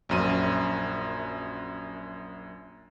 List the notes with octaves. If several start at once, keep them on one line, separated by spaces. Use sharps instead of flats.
A#1 F#2 D#7